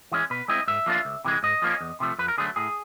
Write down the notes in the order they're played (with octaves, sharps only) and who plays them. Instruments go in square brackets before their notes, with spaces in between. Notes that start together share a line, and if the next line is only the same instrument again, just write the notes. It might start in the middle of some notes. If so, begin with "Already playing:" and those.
[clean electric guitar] E3 G#3 C#4
B2 B4
G#3 C4 E4 D#5
G#2 E5
F3 A#3 D4 F4
C#2
C3 E3 G#3
G#2 D#5
F3 A#3 C#4
E2
C3 F3 A3
F2 B4
A#4
D3 F#3 A3 G#4
A2 G#4